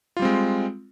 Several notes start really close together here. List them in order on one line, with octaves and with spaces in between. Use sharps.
F4 G3 C4 G#3